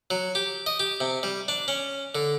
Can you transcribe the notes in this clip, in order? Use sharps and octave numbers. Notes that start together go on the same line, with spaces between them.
F#3
G4
D#5
G4
C3
G3
D4
C#4
D3